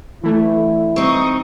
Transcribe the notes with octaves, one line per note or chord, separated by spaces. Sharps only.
D3 E3 A3 E4
C4 D#4 C#6 D#6